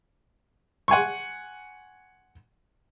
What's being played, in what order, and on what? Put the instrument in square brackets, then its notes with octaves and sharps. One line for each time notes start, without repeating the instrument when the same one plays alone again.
[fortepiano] F#5 G#5 C6 C#6